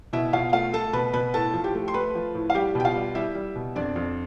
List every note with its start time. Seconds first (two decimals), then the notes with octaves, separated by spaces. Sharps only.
0.13 B2 E4 E5
0.33 B2 F4 F5
0.53 A3 F4 F5
0.73 A3 A4 A5
0.93 B2 B4 B5
1.13 B2 B4 B5
1.34 A2 A4 A5
1.53 F3
1.64 G4 G5
1.74 A3
1.88 C6
1.94 A3 B4 B5
2.15 F3
2.35 A2
2.50 F5
2.54 G3 G4 G5
2.75 B2 G5
2.85 F4 F5
2.95 G3
3.15 G3 E4 E5
3.35 G3
3.56 B2
3.76 F2 D4 D5
3.96 F2